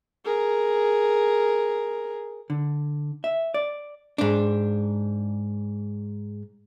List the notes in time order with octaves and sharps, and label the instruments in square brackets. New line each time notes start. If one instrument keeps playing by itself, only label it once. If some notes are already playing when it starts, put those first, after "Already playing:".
[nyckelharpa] G#4 A#4
[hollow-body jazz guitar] D3
E5
D5
G#2 D4